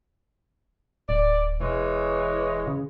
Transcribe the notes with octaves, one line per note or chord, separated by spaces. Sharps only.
D1 D5
E1 E3 G#3 C#5
C#3